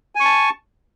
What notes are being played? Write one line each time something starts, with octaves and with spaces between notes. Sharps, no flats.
G#5 A5 C#6